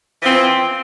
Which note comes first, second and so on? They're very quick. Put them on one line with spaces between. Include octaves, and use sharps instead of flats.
E3 F3 C4